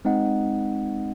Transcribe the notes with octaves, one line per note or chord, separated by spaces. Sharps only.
G#3 C4 D#4 D#5 F#5